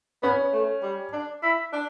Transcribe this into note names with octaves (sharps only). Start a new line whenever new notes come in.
B3 C#4
A3
G3
D4
E4
D4